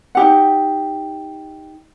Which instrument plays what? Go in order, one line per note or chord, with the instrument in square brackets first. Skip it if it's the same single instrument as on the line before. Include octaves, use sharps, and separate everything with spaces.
[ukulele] D#4 G4 F#5